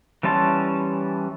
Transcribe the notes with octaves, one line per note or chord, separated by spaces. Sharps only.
E3 G3 C#4 A5 C6